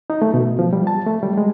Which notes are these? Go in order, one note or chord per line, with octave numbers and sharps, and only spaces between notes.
D#4
A3
B2
F3
G3
A5
A3
G3
G#3